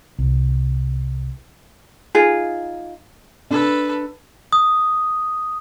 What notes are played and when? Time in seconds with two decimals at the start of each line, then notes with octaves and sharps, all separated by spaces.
0.19 C2
2.15 D#4 F4 G#4
3.50 D4 A4 B4
4.53 D#6